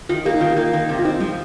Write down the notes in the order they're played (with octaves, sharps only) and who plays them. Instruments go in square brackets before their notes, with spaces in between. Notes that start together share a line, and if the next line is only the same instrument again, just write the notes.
[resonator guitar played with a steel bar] D#3 [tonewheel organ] F4
[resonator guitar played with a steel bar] A#3 [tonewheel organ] G4
[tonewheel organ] D#4
[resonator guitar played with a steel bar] D#3 [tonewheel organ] F4
[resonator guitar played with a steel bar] A#3
D#3
C3
[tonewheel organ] F4
[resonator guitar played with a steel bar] C4 [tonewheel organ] D#4
[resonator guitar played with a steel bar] F3 [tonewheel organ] G3